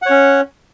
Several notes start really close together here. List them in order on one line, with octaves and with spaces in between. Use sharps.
F#5 C#5 C#4